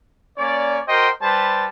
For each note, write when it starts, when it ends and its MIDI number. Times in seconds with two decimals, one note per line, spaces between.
0.38 0.79 58
0.38 0.79 61
0.38 0.79 73
0.38 0.79 74
0.88 1.10 66
0.88 1.10 70
0.88 1.10 72
0.88 1.10 75
0.88 1.10 79
0.88 1.10 84
1.21 1.66 55
1.21 1.66 71
1.21 1.66 72
1.21 1.66 81